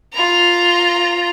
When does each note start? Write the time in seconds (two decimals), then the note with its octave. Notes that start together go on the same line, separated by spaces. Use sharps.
0.14 F4 A#5